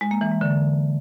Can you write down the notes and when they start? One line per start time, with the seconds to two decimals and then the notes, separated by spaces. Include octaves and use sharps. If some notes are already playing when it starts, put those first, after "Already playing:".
0.01 G#3
0.11 A#3
0.21 E3
0.31 G#3
0.41 D3